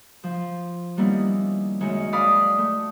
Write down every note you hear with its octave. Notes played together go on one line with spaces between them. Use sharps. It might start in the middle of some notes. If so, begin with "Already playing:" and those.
F3
D#3 G3 A#3 B3 C#4 E4
F#2 D#3 G#3 C#5
D5 F5 B5 D#6
A3